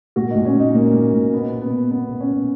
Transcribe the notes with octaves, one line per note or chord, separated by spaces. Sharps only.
A#2 F#4
D#4
A#2
C#4
A#2 D#4
A#2 A#3
A#2
A#2
B2 B3
B2
B3
B2
B2 B3
B2
C#4
B2